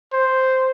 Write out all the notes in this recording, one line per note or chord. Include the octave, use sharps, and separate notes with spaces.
C5